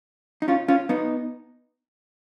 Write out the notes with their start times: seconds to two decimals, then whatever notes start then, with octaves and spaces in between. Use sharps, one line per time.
0.42 D#4
0.48 C#4 F4
0.68 C#4 F4
0.89 B3 D#4